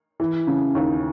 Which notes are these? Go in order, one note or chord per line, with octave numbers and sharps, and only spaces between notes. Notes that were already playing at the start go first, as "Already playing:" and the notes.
E3
C#3
D#2